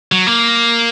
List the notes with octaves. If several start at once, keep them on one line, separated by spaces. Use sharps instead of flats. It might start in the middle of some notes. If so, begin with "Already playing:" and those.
F#3
A#3